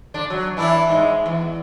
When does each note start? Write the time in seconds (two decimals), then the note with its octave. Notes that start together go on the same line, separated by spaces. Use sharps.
0.14 D3 D4
0.30 F#3
0.57 E3 D4 E4
0.89 G#2 G#3
1.26 E2